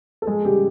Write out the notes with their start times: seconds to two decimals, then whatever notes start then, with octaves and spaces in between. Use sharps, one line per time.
0.22 A4
0.27 F3 G#3 G#4
0.45 C#3 G3 G4